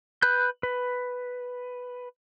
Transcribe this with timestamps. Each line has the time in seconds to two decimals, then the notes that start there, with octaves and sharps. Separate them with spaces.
0.22 B4 B5 F#6 G6
0.63 B4